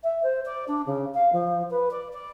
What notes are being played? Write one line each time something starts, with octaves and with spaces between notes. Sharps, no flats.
E5
C5
D5
D4
C#3
F5
F3
B4
D5
D5